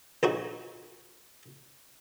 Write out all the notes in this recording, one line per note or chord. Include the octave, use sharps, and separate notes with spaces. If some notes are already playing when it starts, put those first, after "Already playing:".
A#1 D#4 F#4